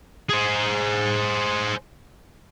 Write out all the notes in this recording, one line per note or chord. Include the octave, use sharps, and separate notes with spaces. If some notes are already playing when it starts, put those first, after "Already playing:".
G#4 C5